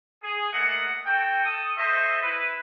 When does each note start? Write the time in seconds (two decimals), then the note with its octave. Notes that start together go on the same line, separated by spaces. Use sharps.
0.23 G#4
0.53 A3 A#3 D#5 F#5
1.06 F#4 A4 G5
1.45 A4 D#6
1.78 F#4 A4 C5 D#5 E5
2.22 E4 B4